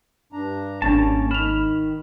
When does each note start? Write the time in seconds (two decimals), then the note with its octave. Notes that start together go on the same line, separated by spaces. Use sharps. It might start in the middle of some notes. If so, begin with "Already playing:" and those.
0.33 G2 D4 A#5
0.82 G#1 G3 A#3 C#4 D4 A5 A6
1.31 D#3 B5 F6 E7 F7